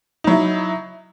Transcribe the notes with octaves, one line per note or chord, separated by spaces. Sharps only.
F#3 D#4 E4